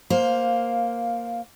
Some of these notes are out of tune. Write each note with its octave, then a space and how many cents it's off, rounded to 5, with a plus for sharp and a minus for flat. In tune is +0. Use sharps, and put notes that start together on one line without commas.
A#3 +0 C5 +0 F5 +10